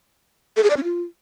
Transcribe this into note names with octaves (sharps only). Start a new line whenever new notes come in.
A4
G#4
D5
C#4
F4